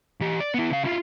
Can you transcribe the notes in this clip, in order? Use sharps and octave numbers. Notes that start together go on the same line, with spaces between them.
E3 G4
D5
B3 E4
C#3 F5
E4 F4